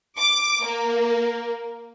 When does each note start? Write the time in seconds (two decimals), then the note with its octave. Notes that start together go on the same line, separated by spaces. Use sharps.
0.19 D6
0.64 A#3